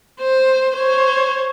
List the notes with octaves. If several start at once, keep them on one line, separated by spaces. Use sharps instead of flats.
C5
C5 C#5